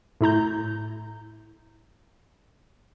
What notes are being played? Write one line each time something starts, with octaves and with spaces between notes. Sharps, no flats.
A2 E4 A#5 G6